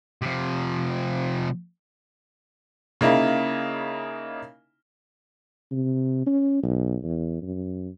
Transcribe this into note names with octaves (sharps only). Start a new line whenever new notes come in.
C3 F3
C#3 A#3 D#4 E4
C3
C#4
B1
E2
F#2